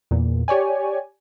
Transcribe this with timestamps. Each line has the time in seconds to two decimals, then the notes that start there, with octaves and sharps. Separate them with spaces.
0.11 E2 A#2
0.48 G4 C#5 D5 G#5